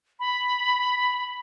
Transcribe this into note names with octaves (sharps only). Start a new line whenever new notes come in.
B5